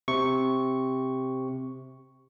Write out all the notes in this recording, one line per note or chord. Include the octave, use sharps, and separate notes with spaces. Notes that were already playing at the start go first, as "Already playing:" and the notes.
C3 C#6